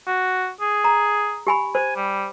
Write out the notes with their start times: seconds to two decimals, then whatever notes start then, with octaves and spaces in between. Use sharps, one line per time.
0.07 F#4
0.61 G#4
0.84 A#5
1.47 G4 G#5 B5
1.75 C5 G#5
1.96 G3